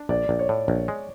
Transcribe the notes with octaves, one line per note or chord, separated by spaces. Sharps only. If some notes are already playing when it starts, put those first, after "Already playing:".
Already playing: D4
A#1 D5
A#1
C#5
A2
A#1
G#3